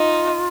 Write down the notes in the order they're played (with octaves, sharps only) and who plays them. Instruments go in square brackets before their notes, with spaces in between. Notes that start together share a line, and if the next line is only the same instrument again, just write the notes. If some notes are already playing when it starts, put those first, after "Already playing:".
Already playing: [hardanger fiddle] D#4 [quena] F4